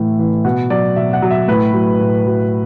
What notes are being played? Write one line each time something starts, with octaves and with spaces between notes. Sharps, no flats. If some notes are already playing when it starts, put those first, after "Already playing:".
Already playing: A2 E3
E3
B2 F#5
F#3 D5
B2 E5
F#5
F#3
E5
A2 B4
F#3
A2
F#3